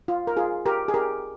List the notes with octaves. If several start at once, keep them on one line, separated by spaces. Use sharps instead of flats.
F4
A#4
F4 G#4
G4 A#4
G#4
G4 A#4